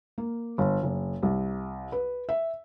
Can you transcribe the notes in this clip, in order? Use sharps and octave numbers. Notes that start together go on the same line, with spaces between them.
A#3
G1
F#1
C2
B4
E5